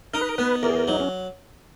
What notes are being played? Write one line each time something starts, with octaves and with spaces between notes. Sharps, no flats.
D#4 A#4
B4
A#4
B3 B4
E2 A#4
G#4
A#4
F#3 D#4
C#4